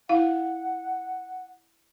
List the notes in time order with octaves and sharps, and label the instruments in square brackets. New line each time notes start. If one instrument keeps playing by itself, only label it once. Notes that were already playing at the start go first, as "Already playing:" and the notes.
[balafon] E4 F5 [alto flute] F#5